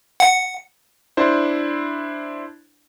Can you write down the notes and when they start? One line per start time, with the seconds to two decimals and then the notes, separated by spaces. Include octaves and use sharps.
0.20 F#5 C#7
1.17 D4 E4 C5